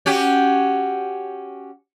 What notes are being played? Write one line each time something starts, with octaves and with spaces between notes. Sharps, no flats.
C#4 F#4 G4